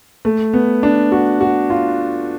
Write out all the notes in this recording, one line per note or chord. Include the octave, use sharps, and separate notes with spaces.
A3
B3
D4
F#4
F#4
F4